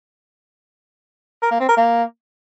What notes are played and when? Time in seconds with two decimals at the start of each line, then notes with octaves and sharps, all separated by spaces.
1.43 A#4
1.51 A#3
1.60 C4
1.68 A#4
1.77 A#3